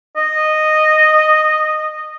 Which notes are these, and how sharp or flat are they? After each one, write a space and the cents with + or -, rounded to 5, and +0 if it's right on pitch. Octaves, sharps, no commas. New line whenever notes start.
D#5 -10